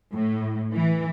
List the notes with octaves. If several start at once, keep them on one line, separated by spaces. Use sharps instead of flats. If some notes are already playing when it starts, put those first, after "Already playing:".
A2
E3